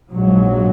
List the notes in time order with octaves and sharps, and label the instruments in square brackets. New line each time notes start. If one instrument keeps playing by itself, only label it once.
[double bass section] A#1 G#2 F#3